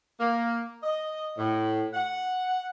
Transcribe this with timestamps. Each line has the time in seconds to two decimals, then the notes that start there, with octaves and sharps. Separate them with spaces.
0.20 A#3
0.83 D#5
1.38 A2
1.93 F#5